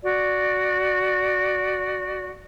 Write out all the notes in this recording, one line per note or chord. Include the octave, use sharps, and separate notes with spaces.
F#4 D5